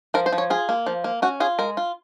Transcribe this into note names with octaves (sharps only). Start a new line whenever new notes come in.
F3 A#4
C5
F3
C#5
F4 G#4
A#3
F3
A#3
C#4 F#4
F4 G#4
G#3 A#4
F4